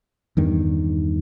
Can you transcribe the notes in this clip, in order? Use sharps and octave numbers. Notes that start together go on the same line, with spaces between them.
E2 G2 D#3